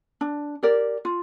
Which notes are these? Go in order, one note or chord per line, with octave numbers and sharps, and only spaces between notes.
D4
G4 A#4 D5
F4